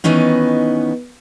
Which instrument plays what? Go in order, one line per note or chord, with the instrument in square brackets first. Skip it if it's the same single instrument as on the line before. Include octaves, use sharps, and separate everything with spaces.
[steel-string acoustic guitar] D#3 E3 B3 C#4 D#4